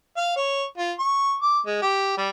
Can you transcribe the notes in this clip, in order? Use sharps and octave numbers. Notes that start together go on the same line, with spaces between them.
F5
C#5
F4
C#6
D6
G#3
G4
G3